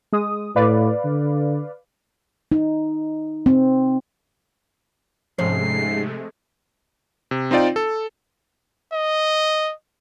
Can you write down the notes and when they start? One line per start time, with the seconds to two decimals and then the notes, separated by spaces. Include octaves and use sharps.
0.13 G#3 D#6
0.56 A2 B4 D5 F5
1.04 D3
2.52 D#4
3.46 C4
5.38 G#2 C3 F3 G#3 A3 C#4 C7
7.31 C3
7.51 C4 D#4 F4 D5 G5
7.76 A4
8.93 D#5